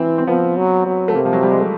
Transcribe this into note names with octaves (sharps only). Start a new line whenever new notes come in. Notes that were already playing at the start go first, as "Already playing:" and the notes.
Already playing: E3 C4
C4
F3 B3
F#3
F#3
A3
C3 A#3
F3
F#3
G3
G#3
A3